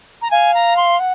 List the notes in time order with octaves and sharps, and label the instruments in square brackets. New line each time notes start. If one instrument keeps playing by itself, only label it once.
[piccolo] A#5
[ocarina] F5 [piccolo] G#5
[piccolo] A#5
C6
[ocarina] F#5